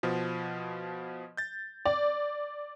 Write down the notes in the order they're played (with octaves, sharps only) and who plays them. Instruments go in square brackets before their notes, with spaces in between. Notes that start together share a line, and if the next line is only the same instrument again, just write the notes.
[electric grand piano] B2 F3
G6 A6
[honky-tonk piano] D5